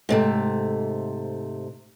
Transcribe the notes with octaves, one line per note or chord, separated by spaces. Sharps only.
G#2 C3 A3